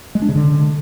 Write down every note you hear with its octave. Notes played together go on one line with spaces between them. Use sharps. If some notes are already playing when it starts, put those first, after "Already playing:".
G#3
D4
C#3
D3